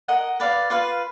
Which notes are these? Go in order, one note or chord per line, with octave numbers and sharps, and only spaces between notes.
A#4 D#5 F#5
B4 D5 F5
F4 B4 F5